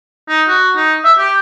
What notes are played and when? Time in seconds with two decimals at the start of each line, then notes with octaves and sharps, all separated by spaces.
0.28 D#4
0.48 F#4
0.76 D#4
1.04 E5
1.18 G4